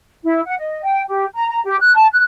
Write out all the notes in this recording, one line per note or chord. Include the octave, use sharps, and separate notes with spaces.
E4
F#5
D#5
G5
G4
A#5
A#5
G4
F#6
A5
F#6